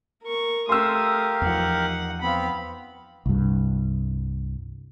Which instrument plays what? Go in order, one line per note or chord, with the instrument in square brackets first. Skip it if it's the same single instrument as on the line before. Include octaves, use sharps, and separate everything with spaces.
[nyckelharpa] A#4 C#6
[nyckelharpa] A3 D#6 [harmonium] G4 A#4 F5 [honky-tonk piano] C6 E6
[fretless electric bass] E2 F3 [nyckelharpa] D#4 F#5
[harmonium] B3 C4 [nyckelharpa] F5 B5
[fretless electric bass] C2 G2